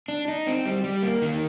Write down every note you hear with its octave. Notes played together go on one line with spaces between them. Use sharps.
D4
D#4
C4
G3
G3
A#3
D#3